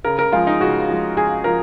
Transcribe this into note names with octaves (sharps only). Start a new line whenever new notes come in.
C#3 A#4
A#4
F3 G#3 F4
D#4
C#3 F#4
F3 G#3
C#3 G#4
F3 A#4